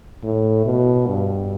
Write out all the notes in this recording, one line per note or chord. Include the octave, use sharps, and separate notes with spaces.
A2
B2
G2